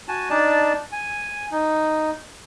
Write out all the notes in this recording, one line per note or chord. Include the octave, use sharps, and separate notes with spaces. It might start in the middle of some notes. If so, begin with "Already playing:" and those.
F#4 G#5 A5
D4 D#4 D5 A5
G#5
D#4